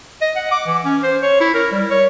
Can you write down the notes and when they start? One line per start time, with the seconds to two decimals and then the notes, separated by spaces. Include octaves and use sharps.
0.21 D#5
0.36 F#5
0.51 D6
0.67 E3
0.85 C#4
1.03 C5
1.23 C#5
1.41 E4
1.54 A#4
1.72 G3
1.90 C#5